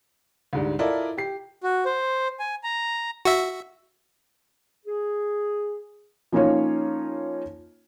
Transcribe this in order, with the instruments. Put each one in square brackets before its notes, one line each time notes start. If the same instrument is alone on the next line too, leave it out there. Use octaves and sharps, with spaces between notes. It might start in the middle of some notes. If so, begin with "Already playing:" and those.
[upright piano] D2 G#2 G3
E4 F4 A4 A#4 D5 D#5
G4 C7
[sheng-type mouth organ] F#4
C5
G#5
A#5
[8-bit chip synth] F#4 E5
[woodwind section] G#4
[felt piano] F3 A#3 C#4 D#4 F4 C#5